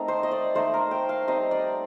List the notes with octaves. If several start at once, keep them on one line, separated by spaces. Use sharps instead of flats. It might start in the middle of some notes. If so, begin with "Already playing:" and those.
Already playing: A3 C4 D#4 A#4
C5
D#5
D5
A3 D#4 C5
A#4
G5
F5
G3 C4 D#4 D#5
D5